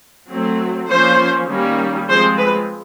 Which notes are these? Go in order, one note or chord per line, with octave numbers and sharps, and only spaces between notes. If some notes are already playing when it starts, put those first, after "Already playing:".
F#3 A3 C4
F3 A#3 C#4 C5
D#3 G3 A#3 C#4
F3 G#3 C4 C5
B4